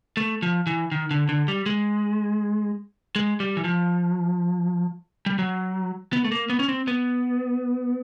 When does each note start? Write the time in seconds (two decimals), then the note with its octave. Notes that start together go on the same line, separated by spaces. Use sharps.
0.17 A3
0.42 F3
0.67 E3
0.92 D#3
1.11 D3
1.29 D3
1.48 G3
1.66 G#3
3.16 G#3
3.40 G3
3.57 E3
3.64 F3
5.26 G3
5.39 F#3
6.13 B3
6.24 A3
6.32 A#3
6.50 B3
6.59 C#4
6.69 C4
6.88 B3